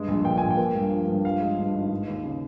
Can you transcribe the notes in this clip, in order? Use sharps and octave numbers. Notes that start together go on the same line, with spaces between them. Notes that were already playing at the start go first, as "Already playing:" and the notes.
Already playing: G2 G#3
A#1
A#2 G5
A#1 G#5
G5
A#3
G2
F3
G2
F3 F5
G#3
G2
G#1
G#3
D#2
C#3